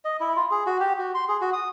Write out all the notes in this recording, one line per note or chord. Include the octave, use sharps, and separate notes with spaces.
D#5
E4
F4
G#4
F#4
G4
F#4
C6
G#4
F#4
D#6